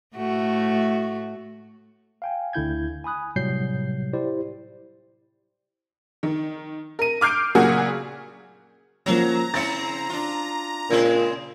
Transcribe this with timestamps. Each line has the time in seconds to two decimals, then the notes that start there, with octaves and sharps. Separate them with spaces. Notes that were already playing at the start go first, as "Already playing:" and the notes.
0.16 A2 A3 F#4
2.22 F5 G5 G#5
2.53 D2 D3 E4 G6 G#6
3.04 G#5 B5 D#6 F#6
3.36 A2 C3 F#3 G3 G6 C7
4.13 E4 G4 C5 D5
6.23 D#3
6.99 A#4 D#7
7.21 D6 F6 G6 C7 D7
7.55 A#2 C#3 F#3 A#3 F#4 G#4
9.06 F3 F#3 A#3 C#4 A#5
9.54 C#3 C4 E4 A6 C#7
10.10 D4 F4
10.90 A#2 C#3 G#3 C4